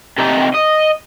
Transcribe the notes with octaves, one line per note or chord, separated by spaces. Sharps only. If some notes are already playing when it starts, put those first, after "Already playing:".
C3 D#4
D#5